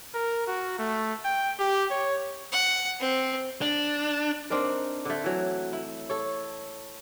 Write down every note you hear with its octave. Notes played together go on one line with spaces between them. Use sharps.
A#4
F#4
A3
G5
G4
C#5
F#5
C4
D4
C4 D4 D#4 A#4
D3 A3
E3 F#3
E4
A4 C#5